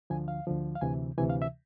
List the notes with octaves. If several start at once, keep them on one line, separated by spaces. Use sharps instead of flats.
D2 D3 F3 G#5
F5
D2 D3 F3
F5
D2 C3 E3 G#5
D2 C3 E3 G#5
F5
E5